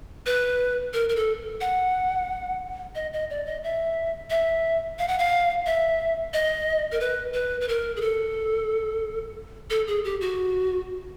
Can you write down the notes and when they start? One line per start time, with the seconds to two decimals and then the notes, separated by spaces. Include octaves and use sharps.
0.26 B4
0.93 A#4
1.09 A#4
1.16 A4
1.61 F#5
2.95 D#5
3.13 D#5
3.30 D5
3.46 D#5
3.64 E5
4.30 E5
4.99 F5
5.08 F#5
5.19 F5
5.66 E5
6.33 D#5
6.92 A#4
7.00 B4
7.34 B4
7.61 B4
7.68 A#4
7.96 G#4
8.01 A4
9.70 A4
9.87 G#4
10.04 G4
10.21 F#4